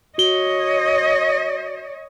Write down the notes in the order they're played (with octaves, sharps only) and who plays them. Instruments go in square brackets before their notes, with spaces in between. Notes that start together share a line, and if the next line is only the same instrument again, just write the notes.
[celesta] F#4 G7 [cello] C#5 D#5